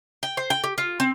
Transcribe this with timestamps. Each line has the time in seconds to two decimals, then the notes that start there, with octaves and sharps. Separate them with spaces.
0.23 G5
0.37 C5
0.50 G5
0.64 G4
0.78 F4
1.00 C4